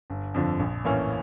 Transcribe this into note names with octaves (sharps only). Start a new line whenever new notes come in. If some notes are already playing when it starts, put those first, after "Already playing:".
G1
F2 D3 F3
A#1
A2 E3 A#3 C#4